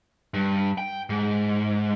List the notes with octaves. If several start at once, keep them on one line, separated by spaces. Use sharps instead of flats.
G2
G5
G#2